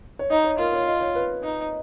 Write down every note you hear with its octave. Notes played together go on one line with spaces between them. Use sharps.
C#5
D#4 D#5
C#5
F4 A#4
C#5
D#5
C#5
B4
D#4